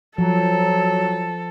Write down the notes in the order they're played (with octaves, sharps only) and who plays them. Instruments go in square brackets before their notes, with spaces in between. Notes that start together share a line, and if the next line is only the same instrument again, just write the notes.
[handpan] F3 [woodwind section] F#3 [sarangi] A4